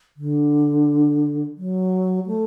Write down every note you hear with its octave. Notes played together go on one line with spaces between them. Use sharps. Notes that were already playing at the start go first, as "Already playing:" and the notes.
D3
F#3
A3